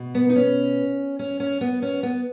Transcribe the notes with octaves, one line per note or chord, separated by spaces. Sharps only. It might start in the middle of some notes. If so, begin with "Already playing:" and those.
Already playing: B2
B3
D#4
C#4
C#4
C#4
B3
C#4
B3